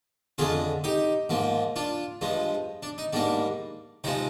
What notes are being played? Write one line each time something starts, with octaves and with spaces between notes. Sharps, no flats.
F2 D3 G#3 F4 G#4
D#4 G4
G#2 F3 A#3
D4 F4
G2 F3 G#3
D4
D#4
G#2 G3 A#3 D4
C3 F3 G#3 D#4